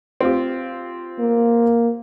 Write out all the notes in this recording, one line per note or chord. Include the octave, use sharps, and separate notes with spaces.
C4 F4 G4
A#3